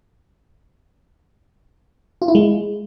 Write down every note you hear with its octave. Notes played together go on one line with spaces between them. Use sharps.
F4
E4
G#3